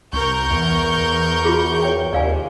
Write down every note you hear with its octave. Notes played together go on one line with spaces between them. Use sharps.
C2 A#4 C#6 G6
E2
E2
F4 F#4 G#4
C#5 G5
D#2 C3 D5 F5 G#5